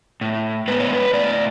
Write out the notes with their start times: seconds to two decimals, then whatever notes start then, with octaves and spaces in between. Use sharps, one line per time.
0.21 A2
0.68 G#3 B3 B4
0.80 C#5
0.93 B4
1.13 A2 D5